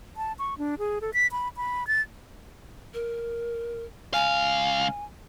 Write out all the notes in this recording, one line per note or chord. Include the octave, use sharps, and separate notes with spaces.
A5
C#6
D4
G#4
A4
B6
B5
B5
A6
A#4
C#2 F5 G#5